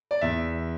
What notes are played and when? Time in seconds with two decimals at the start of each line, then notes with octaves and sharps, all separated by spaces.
0.11 D5
0.21 E2 E5